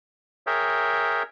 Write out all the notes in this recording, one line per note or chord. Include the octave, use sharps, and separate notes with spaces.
G#4 A#4 C#5 E5 G5